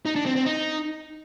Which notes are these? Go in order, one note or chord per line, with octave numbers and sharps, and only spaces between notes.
D#4
D4
C4
C4
D#4